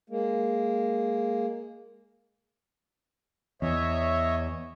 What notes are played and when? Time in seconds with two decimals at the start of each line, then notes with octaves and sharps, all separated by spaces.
0.10 G#3 A#3
3.62 E2 C#5 D#5 E5